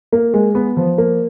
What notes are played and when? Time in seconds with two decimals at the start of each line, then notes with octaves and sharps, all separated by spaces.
0.12 A#3
0.34 G#3
0.55 B3
0.77 F3
0.98 A#3